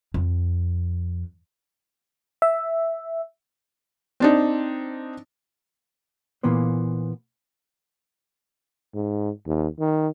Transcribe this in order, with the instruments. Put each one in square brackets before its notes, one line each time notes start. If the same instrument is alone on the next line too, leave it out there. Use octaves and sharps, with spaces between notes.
[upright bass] F2
[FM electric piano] E5
[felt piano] C4 D4 D#4
[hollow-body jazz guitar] A#2 E3 A#3 B3 C5
[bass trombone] G#2
D#2
D#3